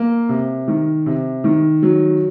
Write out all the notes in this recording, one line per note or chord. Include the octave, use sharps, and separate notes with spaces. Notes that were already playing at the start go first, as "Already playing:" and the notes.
Already playing: A#3
C3
D#3
C3
D#3
F#3